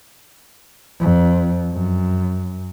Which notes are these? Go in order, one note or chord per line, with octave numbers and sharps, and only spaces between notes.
F2
F#2